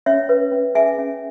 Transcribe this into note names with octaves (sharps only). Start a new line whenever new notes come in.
C#4 C#5 E5
B4
C#4
G#4 E5 G#5
C#4